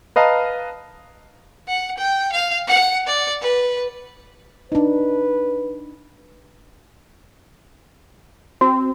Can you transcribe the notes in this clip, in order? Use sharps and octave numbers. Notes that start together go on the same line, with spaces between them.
B4 D#5 F5 A5 A#5
F#5
G5
F5
F#5
D5
B4
D4 D#4 B4
C4 F#4